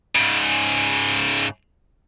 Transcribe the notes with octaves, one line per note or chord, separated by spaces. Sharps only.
G#2 C#3